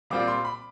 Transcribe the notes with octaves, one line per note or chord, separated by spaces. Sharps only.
A#2 G3 C4 F4 D6
C6
B5